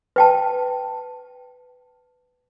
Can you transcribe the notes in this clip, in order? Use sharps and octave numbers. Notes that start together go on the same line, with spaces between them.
B4 G5 A5